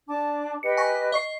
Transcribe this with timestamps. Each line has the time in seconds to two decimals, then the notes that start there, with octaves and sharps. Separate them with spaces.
0.08 D4 A5 D6
0.63 G4 B4 D#5 C#7
0.77 G#5 C#6 A#6
1.12 D#5 C#6 C7